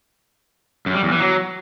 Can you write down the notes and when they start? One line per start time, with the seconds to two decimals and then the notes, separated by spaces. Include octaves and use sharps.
0.86 F#2
0.95 G3
1.03 E2
1.11 E3
1.20 F#3